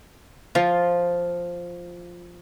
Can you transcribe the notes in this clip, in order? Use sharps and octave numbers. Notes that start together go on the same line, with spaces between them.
F3 F4